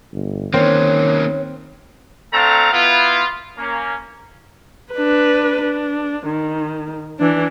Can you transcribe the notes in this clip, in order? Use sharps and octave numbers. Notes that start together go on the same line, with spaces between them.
G1
D#3 A#3 C4 C#4 C#5
A3 C4 D4 A4 F5 A#5
B3 E4 F4
A#3 C#4
D4 B4
D4
D#3
E3 D4